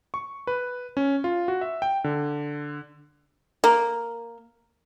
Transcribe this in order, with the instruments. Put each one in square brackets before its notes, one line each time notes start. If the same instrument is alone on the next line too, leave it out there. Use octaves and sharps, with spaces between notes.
[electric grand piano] C#6
B4
C#4
F4
F#4
E5
G5
D3
[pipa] A#3